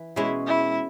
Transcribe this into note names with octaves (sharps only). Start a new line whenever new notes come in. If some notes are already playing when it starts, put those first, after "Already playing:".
Already playing: E3
B2 G#3 C#4 E4
E4